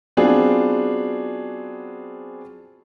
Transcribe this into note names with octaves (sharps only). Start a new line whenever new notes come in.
F#3 B3 C4 D4 F4 G#4